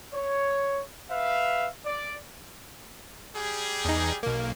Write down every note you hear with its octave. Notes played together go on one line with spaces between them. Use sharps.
C#5
B4 E5 F5
D5
G3 G4 G#4
E2 D#4
B1 A#3